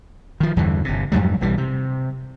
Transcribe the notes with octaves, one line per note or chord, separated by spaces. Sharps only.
D#3 F3
E2 G2 D3 E3
G1 C3
F2 G#2 F#3 G3
B1 E3 G3
C3